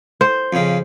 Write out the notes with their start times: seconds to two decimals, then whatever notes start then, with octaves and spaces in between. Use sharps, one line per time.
0.21 C5
0.53 F2 C#3